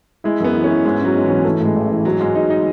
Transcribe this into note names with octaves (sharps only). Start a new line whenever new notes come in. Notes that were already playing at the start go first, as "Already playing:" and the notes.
G#3 E4
F#2 B3
E3
C#4
E4
G#2 G#3
F#3 C#4
G#2
E3 C#4
E3 A3
A2 G#3
A1
E3
G#2 F#3
G#2 G#3
G#2 D#4
D#4